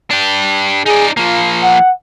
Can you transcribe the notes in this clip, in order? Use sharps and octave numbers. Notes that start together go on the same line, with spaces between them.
D4 G4
D#4 G#4 D5
F3 A#3 F4
F#5